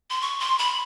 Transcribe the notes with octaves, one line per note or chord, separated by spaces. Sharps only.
C6
C#6
C6
B5